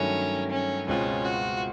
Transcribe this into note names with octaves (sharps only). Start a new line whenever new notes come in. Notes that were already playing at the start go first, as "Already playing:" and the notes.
Already playing: G2 D#3 F#3 A3 C#4
C#4
C#2 B2 G#3 C4 C#4 F4
F#4